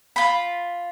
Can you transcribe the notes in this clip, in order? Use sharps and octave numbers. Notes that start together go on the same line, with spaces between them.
F4 B5